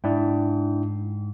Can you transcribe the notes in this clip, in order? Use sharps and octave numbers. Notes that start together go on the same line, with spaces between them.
G#2 D4 E4 G5